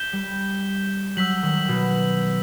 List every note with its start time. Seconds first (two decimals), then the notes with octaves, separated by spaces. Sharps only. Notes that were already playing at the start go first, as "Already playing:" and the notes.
Already playing: G6 B6 E7 G7
0.13 G3
1.16 F#3 E6 B6 F#7
1.43 D#3
1.69 B2